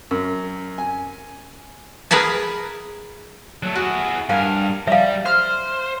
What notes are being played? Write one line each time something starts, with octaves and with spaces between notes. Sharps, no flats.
F#2
G#5
G#4 A#4 B4 G#5 A5
F#3 A3
E4 F#4 G#4
G2 A#4 F5 G#5
G3 E5 F5
C5 F6